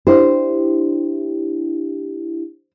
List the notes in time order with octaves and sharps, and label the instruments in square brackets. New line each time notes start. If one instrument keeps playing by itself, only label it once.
[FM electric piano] D4 E4 G4 [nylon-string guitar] C5